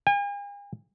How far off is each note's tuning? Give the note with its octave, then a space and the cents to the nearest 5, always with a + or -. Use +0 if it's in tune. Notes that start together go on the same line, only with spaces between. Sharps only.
G#5 -45